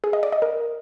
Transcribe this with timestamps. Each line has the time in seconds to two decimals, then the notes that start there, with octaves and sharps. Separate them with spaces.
0.04 G#4
0.13 D#5
0.23 D5
0.32 D#5
0.42 A#4